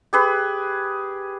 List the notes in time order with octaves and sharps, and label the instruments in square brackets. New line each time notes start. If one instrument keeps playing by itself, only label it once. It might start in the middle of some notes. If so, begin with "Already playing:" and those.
[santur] G4 G#4 B4